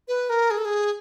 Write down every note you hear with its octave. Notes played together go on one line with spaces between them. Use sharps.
B4
A#4
G#4
A4
G#4